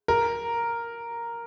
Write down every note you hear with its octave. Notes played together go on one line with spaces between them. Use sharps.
A#4